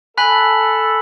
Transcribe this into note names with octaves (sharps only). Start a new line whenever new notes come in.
A4 G#5 B5 F#6 B6 F#7